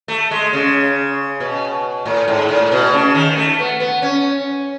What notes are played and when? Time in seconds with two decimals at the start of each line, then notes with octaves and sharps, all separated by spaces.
0.08 A3
0.31 G#3
0.53 C#3
1.40 B2
2.06 A2
2.28 G#2
2.49 A2
2.72 B2
2.93 C#3
3.14 D#3
3.36 A3
3.59 B3
3.80 B3
4.02 C#4